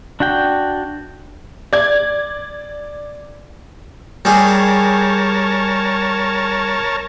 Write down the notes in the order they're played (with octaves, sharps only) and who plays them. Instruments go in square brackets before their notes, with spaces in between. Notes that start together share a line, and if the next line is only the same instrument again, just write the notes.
[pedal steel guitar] D4 F#4 F#5 G5
[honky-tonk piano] D5 G#6
[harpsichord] G3 G#4 [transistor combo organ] A#4 C#5 A5